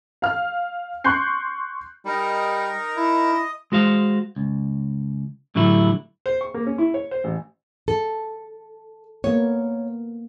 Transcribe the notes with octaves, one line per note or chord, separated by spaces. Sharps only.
F5 F6
C6 C#6 F#6 G6 C7
G3 D#4 A#4
E4
D#5
G#3 F#4 C5 F5
C#2
A2 D3 F#3 G3 E4
C5
C#6
A#3
C#4
E4
C#5
C5
A1
A4
A#3 B3 C#5